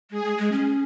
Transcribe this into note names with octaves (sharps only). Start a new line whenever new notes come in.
G#3 G#4
G#3
G#3
C#4